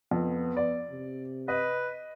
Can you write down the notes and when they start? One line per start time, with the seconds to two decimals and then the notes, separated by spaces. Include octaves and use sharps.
0.11 F2 B3
0.57 D5
0.90 C3
1.48 B4 D#5